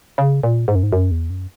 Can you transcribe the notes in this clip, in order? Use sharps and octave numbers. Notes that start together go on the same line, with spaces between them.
C#3
A#2
G#2
F#2
G#2
F#2
E2
F#2